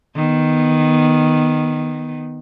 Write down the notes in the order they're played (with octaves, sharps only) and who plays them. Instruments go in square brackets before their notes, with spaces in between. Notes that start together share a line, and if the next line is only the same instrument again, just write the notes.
[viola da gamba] D#3 B3